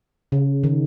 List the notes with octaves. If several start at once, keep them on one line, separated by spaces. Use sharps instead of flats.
C#3
D#3